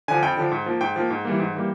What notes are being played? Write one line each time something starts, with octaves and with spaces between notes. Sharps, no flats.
D3 F3 G#5
F2 G5
D3 F3
G#2
F3 A#3
G#2 G5
F3 A#3
G#2
E3 G3 A#3
G#2
E3 G3 A#3